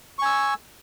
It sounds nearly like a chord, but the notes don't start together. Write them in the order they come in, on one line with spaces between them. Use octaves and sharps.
C#6 G#5 E6